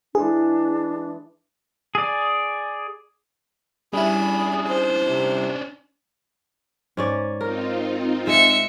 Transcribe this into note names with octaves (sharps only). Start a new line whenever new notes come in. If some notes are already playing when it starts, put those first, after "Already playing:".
E3 G#3 D4 G#4
G#4 D5
G3 C#4 D4 E4 G#4 B5
C5
C3
G#2 C#4 D5
C4 D#4 F4 A#4
G#3 E5 C#7